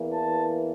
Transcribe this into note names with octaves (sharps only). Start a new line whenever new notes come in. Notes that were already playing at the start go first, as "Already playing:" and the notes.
Already playing: E2 E3 A#3
A5